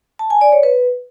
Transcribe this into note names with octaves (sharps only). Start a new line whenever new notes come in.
A5
G#5
D5
C#5
B4